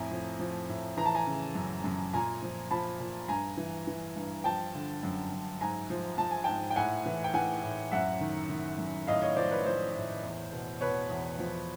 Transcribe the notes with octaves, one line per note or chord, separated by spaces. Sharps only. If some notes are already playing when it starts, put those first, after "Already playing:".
Already playing: F2 A2 G#5 A#5
F3
F3
A2
E3 A#5
A5
G#5 A#5
C#3
F#2
F#2
A#2 G#5 A#5
F3
F3 A5 B5
A#2
G2 G#5 A#5
E3
E3
G2
F3 G5 A5
D3
F#2
F#2
G#2 G#5 A#5
F3
F3 A5
G#5
G#2 G5 A5
G5
A2 F#5 G#5
E3
G5
E3 F#5 G#5
A2
F#2 E5 F#5
D#3
D#3
F#2
A2 D#5 F5
C#5 D#5
F3 C5 D5
B4 C#5
F3 C5
A2
E2
B2
B2 B4 C#5
E2
F3